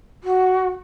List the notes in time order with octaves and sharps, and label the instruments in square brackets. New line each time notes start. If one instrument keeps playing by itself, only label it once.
[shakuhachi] F#4